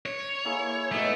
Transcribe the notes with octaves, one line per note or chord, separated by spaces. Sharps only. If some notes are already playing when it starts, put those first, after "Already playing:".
C#5
A#3 E4 G#4
G#2 B2 A3 E5